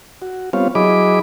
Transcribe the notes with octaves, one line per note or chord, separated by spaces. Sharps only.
F#4
G3 B3 C4 F4 C#5 F5
F#3 E4 G#4 D#5 B5 D6